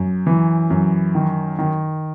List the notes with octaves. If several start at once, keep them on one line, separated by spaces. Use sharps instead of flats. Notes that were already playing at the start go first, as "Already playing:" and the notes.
Already playing: F#2
E3
F#2
D#3
D#3